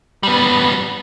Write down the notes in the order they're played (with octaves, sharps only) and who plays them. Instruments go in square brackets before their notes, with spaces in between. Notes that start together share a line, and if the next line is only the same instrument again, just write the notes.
[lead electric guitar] G3 B3